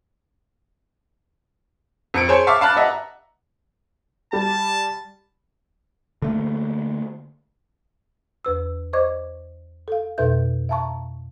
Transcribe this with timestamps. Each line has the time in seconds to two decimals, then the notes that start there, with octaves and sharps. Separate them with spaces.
2.14 F2 C#7 D7
2.28 G#4 C5 C#5 G#5
2.47 E5 F5 A5 C#6 D6
2.61 F5 A5 B5 F#6 A6
2.77 D#5 E5 F#5 A#5
4.33 G3 G4 A5
6.22 D3 A3 A#3
8.45 E2 B4 E6
8.93 C5 D5 D#5 C#6 D6 G#6
9.88 A4 F5
10.18 F2 B2 A4 B4 E5 G6
10.69 E5 F5 A5 A#5 C#6